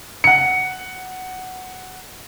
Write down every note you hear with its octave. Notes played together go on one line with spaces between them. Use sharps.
F#5 C#7